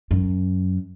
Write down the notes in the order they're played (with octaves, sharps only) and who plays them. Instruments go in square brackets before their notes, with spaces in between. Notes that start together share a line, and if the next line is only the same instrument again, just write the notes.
[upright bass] F#2